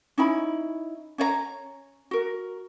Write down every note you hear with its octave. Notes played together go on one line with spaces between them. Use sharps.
C#4 D#4 E4 B5
C#4 C#5 D5 A#5
F#4 A#4